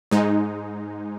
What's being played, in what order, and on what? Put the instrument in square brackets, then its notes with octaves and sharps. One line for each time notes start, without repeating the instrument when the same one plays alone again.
[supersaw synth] G#2 G#3 D#4